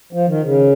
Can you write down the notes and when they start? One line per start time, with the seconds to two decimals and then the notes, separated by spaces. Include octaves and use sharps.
0.13 F3
0.28 D#3
0.43 C#3